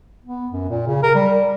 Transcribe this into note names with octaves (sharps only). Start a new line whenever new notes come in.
B3
F#2
A#2
C#3
A#4
G3